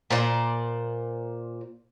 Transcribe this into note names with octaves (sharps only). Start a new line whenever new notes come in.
A#2 C5 D5